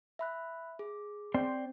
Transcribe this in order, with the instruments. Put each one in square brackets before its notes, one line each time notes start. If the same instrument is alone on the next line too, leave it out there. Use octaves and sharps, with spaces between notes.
[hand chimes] E5 B5 F#6
G#4
[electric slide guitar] C4 C5 D5